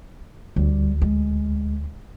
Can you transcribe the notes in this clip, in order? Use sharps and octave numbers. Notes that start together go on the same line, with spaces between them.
D2 G3
G#3